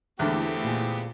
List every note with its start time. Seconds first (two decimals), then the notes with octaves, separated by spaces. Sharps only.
0.19 E2 D3 A3 B3 C4 E4 G4
0.63 A#2 G#4